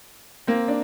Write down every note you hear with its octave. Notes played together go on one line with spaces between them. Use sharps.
A#3 C4
D4